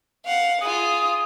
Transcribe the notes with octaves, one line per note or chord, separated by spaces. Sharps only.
F5 F#5
F4 G#4 D#6